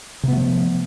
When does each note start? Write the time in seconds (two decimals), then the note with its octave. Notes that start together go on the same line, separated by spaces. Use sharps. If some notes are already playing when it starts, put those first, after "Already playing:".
0.23 C3
0.28 B3
0.32 A3
0.37 F3